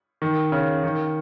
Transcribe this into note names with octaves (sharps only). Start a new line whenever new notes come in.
D#3
C#3
D#3